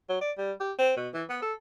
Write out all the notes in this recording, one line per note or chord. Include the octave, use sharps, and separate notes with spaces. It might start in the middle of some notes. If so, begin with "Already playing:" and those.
F#3
D5
G3
G4
C4
B2
E3
B3
A4